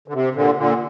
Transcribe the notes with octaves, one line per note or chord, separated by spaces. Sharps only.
D3
C3
A#2 D3
A#2 D3